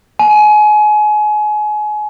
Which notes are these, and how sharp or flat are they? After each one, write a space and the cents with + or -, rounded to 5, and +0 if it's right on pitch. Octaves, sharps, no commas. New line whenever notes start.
G#5 +30